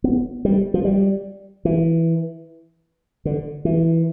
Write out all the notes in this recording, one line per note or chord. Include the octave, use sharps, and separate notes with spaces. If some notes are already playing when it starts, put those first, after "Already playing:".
B3
G3
F3
G3
E3
D3
E3